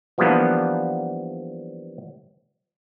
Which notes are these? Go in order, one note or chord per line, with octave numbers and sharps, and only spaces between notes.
E3 F3 G3 A#3 B3 D4